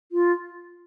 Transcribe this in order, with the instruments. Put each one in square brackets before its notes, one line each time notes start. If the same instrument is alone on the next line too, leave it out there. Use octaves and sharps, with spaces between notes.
[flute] F4